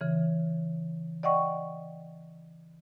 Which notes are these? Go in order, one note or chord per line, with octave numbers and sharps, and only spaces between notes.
C#3 E3
D5 D#5 F#5 G5 C#6